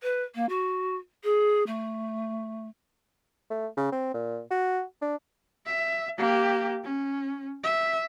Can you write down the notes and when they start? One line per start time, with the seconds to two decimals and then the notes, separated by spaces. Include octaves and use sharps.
0.03 B4
0.35 A#3
0.49 F#4
1.24 G#4
1.67 A3
3.50 A3
3.77 C#3
3.92 C4
4.14 A#2
4.51 F#4
5.01 D4
5.66 E5
6.18 A#3 G4
6.84 C#4
7.63 E5